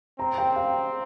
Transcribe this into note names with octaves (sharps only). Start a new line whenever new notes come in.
C4 A#5
G5
F5